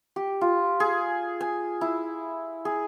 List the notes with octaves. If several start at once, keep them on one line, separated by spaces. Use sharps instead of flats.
G4
F4
G#4
G#5
E4
G#4